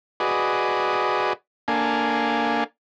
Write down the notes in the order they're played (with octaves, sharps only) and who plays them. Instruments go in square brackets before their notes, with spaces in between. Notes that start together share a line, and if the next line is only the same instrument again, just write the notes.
[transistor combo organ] F#4 G#4 B4 D5 D#5
A#3 D4 A4 F5 G#5